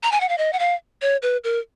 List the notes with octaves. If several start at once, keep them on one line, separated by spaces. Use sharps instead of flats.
A#5
G#5
F#5
F5
D#5
F#5
F5
C#5
B4
A#4